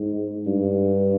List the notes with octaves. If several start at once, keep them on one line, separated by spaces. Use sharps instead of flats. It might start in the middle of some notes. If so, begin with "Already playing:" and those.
Already playing: G#2
G2